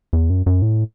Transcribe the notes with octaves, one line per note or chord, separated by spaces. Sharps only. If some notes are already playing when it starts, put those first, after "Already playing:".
E2
F#2
F#2
A2